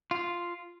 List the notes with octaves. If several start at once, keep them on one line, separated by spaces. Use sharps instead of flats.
F4